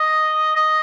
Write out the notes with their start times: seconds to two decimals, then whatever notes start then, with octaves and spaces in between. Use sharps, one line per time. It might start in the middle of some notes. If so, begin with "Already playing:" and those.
Already playing: D#5
0.56 D#5